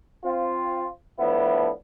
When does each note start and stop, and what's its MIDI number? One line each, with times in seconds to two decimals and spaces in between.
0.24 0.86 60
0.24 0.86 65
1.20 1.69 45
1.20 1.69 53
1.20 1.69 59
1.20 1.69 62
1.20 1.69 64